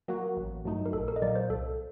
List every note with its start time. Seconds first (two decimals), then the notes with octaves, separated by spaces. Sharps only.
0.08 F#3 A#3 F#4
0.37 A1
0.65 G2 F#3 A3 D#4
0.86 A#4
0.93 A#1 A4
1.08 A#4
1.16 D#5
1.22 A#2 F#3 A#3 D5
1.36 C5
1.50 C2 A4